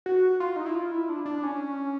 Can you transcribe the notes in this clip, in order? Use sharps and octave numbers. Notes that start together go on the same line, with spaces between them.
F#4
F4
D#4
E4
F4
E4
D4
D4
C#4